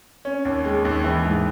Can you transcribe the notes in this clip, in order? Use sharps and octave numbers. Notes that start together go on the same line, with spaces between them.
C#4
D#2
G#3
D#2
E3
G#2